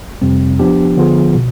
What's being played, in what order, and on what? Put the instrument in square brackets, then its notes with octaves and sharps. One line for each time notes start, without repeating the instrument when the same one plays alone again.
[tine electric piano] F2 C3 G3 C4
F3 B3 D4 G4
D3 F3 B3 F4 G#4
B2